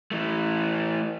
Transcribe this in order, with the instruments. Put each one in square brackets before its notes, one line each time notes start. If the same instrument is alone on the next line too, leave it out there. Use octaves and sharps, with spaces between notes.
[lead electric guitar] E3 A3